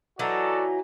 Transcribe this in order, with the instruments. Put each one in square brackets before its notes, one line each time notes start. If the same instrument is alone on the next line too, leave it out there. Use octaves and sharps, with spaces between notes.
[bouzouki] E3 F#3 D#4 [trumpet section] F#4 A4 D5